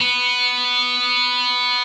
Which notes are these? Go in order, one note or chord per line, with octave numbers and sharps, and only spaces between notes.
B3